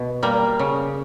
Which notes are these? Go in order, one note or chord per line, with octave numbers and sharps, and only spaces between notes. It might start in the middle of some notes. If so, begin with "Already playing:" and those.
Already playing: B2
G3 A#3
C#3